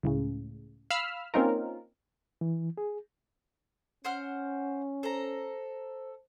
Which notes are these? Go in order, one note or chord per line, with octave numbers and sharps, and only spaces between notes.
C#2 A2 C#3
F5 B5 E6 F6
A#3 C4 C#4 D#4 F4 A#4
E3
G#4
C#4 C5 F#5 F6
A4 C5 A#5